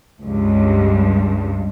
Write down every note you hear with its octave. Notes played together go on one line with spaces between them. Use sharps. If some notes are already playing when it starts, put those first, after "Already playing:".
C#2 G2